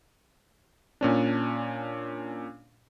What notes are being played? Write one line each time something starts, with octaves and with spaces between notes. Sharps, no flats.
A#2 C#4 D4